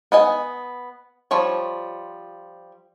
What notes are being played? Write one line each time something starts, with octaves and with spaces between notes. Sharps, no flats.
B3 D#5 G#5
F3 G3 C#5